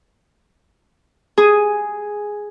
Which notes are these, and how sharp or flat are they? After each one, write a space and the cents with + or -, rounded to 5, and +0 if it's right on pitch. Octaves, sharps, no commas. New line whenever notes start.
G#4 +0 G#5 +0